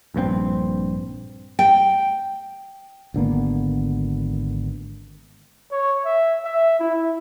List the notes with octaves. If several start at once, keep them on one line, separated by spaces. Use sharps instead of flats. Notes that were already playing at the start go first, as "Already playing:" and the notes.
A#1 G2 D#3 C4
G5
G#1 D3 A#3 B3
C#5
E5
E5
E4